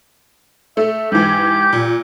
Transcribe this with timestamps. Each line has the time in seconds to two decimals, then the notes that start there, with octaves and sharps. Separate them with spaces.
0.77 A3 E5
1.12 G#2 E3 G4
1.73 A#2